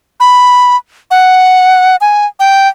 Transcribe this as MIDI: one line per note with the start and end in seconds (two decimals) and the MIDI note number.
0.20 0.76 83
1.11 1.96 78
2.01 2.26 80
2.40 2.68 79